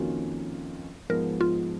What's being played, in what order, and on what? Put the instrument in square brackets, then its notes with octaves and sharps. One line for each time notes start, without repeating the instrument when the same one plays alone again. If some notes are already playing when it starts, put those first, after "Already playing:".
Already playing: [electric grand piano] F2 D#3 A#3 C#4 F4 [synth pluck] F#4
[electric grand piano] G#2 F3 G#3 B3 [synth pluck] A#4
[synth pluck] F4